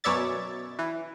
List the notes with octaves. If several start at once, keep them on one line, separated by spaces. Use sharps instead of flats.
F#2 B2 C#5 D5 E5 A6
E3